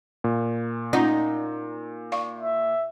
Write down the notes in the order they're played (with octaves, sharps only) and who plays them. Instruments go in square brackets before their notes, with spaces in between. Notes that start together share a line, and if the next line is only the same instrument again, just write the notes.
[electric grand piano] A#2
[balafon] C#4 F4 F#5 [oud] D#4
[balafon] D5 F5 C#6
[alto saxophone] E5